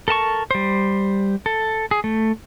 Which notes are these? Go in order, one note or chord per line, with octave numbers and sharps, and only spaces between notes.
A4 A#4 A5 C#6
G3 C5
A4
G#4
A3